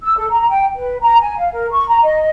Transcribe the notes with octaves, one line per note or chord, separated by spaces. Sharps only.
E6
A4
A#5
G5
B4
A#5
G#5
F5
A#4
C#6
A#5
D#5